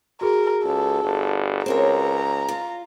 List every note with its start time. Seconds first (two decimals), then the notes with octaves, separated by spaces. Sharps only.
0.21 F#4 G#4 A#4
0.64 C#2 A4
1.02 G1
1.66 C#2 C4 A#4 C#5 A#5
2.48 F4